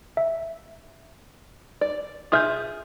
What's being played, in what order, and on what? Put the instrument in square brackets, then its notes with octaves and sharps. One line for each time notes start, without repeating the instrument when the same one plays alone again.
[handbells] E5
[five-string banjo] D5
[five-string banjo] F4 G#4 E5 [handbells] D#6 F6 G6